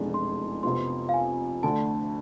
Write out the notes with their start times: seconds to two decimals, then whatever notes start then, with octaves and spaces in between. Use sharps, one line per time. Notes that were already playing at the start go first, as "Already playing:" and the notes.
Already playing: F1 E2 B2 G#3 D4
0.14 C6
0.63 F2 C3 F3 B3 C6
1.09 F5
1.14 G#5
1.63 D2 D3 A3 A5